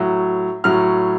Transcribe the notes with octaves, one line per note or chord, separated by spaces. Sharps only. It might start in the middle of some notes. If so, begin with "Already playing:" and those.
Already playing: A2 F#3
A2 F#3 F6